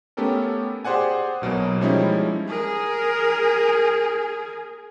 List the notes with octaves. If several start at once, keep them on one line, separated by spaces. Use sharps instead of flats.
A3 B3 C#4 G4 A4 A#4
G4 G#4 C5 D5 F#5 G#5
B1 B2 F#3 A#3
F3 G3 G#3 C#4 D#4 E4
G#4 A#4